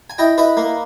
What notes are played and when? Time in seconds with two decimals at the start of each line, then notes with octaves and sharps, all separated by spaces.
0.10 G#5
0.18 E4 D#5 G5
0.38 E4 B4 D#5
0.57 A#3